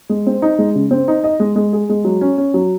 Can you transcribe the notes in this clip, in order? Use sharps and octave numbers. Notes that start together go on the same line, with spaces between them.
G#3
C4
D#4
G#3
C#3
C4
D#4
D#5
G#3
G#3
G#4
G#3
F#3
C#4
C#4
F#3